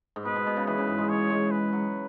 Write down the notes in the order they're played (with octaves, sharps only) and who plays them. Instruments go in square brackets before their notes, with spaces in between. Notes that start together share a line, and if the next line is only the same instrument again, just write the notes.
[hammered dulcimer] G#2
[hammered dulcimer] B2 [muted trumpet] B4
[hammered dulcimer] B2
B2
C#3
[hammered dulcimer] E3 [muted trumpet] B4
[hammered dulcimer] C#3
G#2
G#3
[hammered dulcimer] G#3 [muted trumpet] C#5
[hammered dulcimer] G#3
[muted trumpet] B4
[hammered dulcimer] F#3